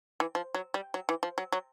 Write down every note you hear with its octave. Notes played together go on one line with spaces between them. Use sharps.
E3
F3
F#3
G3
F#3
E3
F3
F#3
F#3